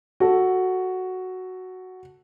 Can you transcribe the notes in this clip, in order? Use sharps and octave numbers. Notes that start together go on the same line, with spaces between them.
F#4 A4